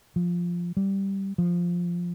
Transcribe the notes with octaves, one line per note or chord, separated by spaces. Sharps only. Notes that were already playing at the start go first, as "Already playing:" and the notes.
F3
G3
F3